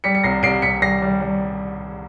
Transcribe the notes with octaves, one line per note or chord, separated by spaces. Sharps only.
G3 B6 C#7
C#7
C2 A#6 C7
C2 C7 D7
C2 B6 C#7
G3 A#6 C7
G3
G3